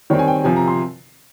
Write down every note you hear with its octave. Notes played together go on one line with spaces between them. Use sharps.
D#3 G3 C4 C#5
G#5
G5
C3 F3 C4 G#5
A#5
C6